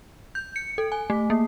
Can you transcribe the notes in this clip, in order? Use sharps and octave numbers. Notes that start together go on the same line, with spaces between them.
G6
C#7
A4
G#5
A3
A#3